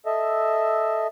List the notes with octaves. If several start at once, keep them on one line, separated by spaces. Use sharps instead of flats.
A4 D#5 E5